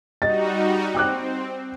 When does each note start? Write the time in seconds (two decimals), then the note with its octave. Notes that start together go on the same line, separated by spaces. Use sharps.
0.22 G3 D#4 F#4 D#5 A6
0.94 C4 G5 D6 F#6